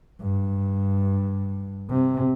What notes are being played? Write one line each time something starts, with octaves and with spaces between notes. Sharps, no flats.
G2
C3